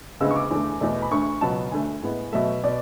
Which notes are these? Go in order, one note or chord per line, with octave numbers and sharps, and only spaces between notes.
D2 C#3 G#3 B3 E6
C#6
D6
E2 D3 A3
E2 B2 A3
B5
D2 D3 A3 C#6
C#2 B2 F#3 B3 A5
D2 D3 A3 G#5
A2 G#3 B3
B2 F#3 A3 E5
B2 D5